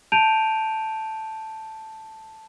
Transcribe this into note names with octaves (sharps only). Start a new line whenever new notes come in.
A5 G6 D7 D#7 F7